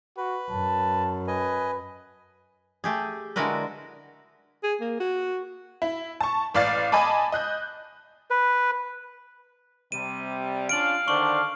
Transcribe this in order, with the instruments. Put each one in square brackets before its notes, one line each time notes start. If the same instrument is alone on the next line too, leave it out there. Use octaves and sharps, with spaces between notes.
[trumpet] F#4 [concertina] B4
[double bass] F#2 [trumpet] A5
[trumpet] B4 [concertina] D#5 G#5
[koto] A3 G4 G#4
D3 G#3 E4 F#4 A#4 B4
[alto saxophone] G#4
A#3
F#4
[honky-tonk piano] E4
A5 C#6
A1 D5 F5 A6
D#5 G#5 A5 B5 D6
D#5 F#6 G6
[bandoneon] B4
[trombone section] C3 G3 [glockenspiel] D#7
[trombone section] C#4 D4 F4 [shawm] F5 [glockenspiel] D7 F#7
[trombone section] D3 D#3 C5 [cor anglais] D4 [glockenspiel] C#6 F#7